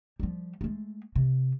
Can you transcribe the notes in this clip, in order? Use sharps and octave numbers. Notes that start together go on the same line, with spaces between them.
F3 G3
G#3 A3
C3